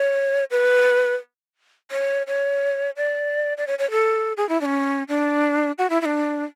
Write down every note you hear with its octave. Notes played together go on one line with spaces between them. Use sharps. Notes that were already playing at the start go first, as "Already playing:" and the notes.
Already playing: C#5
B4
C#5
C#5
D5
D5
C#5
C#5
A4
G#4
E4
D4
C#4
D4
F#4
E4
E4
D4